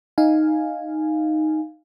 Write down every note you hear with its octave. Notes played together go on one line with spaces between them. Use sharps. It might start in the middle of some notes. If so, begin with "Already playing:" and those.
D#4 F5 G#5